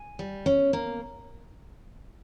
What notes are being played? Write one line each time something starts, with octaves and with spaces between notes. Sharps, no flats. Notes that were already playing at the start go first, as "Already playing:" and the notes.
Already playing: G#5
G3
C#4
A#3